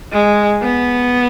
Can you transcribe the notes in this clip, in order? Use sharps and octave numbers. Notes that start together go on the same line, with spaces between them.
G#3
B3